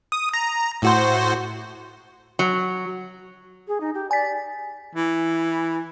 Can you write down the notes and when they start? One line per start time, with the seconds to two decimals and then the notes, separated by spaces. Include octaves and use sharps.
0.12 D#6
0.34 A#5
0.82 A2 F#4 C5
2.39 F#3
3.68 G#4
3.80 D#4
3.94 G4
4.11 D5 G#5 B6
4.95 E3